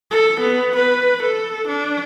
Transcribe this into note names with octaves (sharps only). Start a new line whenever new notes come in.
A4
B3
B4
A4
D4